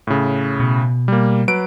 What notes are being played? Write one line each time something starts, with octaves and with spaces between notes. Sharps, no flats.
A2 C#3
B2
G3 A#3
F#3 B4 D7